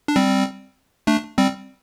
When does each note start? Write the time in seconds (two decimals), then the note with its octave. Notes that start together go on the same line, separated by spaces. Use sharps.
0.08 D4
0.16 G3 C4
1.07 A3 D4
1.38 G3 C4